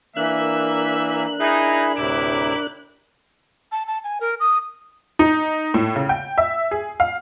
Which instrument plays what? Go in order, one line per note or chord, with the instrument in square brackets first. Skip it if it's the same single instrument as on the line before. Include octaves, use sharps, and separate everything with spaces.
[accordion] E3 A#3 [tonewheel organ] D4 A#4 F#6 [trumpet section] E5
[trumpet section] D#4 [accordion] E4 G#4 E5
[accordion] D2 A2 C3 [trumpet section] E4 G4 D6
[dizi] A5
A5
G#5
A#4
D#6
[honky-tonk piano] D#4
A2
C#3
G5
E5
G#4
F5